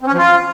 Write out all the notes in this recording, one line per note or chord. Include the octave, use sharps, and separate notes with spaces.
C4
C#4
F3
F4